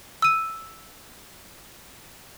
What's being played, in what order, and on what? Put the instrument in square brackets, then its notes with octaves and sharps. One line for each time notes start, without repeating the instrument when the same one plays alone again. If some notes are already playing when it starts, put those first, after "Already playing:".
[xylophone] E6 D#7